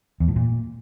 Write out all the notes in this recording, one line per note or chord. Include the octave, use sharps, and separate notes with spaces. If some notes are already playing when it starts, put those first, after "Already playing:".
E2
A2
A#2